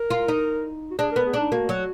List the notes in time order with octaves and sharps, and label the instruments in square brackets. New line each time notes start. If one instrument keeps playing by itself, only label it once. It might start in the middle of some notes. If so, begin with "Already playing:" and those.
Already playing: [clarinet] A#4
[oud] F4
D#4
[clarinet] F#4
[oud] D4 [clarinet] G#4
[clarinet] A#4
[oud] B3
[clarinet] G#4
[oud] D4
[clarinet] D#4
[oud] A#3 [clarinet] F#4
[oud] F#3